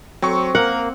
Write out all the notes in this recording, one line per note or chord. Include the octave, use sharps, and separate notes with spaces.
F#3 C4 C#6
A#3 A#4 F#5